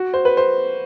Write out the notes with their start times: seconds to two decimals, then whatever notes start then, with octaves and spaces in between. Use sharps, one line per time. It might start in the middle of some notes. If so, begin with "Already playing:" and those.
Already playing: F#4
0.14 C5
0.25 B4
0.37 C5